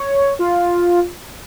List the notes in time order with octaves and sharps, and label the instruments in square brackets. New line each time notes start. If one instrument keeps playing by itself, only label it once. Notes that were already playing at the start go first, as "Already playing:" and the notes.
Already playing: [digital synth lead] C#5
F4